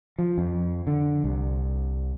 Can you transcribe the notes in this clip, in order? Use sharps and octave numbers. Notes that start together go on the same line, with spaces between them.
F3
F2
D3
C2